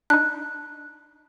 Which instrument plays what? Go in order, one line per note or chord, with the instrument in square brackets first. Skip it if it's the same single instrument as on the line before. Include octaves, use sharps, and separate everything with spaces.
[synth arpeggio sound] D4 D#4 [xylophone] F#6